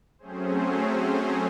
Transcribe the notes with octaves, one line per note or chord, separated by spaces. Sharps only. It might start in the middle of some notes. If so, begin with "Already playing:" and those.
F#3 A3 C4 C#4 G#4 C5